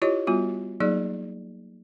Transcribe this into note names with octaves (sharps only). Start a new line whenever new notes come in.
E4 F4 G4 C#5 D#5
G3 B3 F4 F#4
F#3 A#3 D#4 G#4 D5